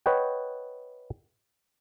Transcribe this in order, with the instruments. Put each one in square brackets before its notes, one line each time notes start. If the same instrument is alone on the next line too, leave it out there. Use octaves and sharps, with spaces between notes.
[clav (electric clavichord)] B4 C#5 D#5 F#5 G5